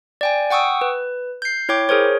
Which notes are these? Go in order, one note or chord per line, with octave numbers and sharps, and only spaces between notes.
D5 G5 G#5
F#5 G5 C#6 D#6 E6
B4
G6 C7
E4 C#5 G5 D6
G#4 A#4 C5 C#5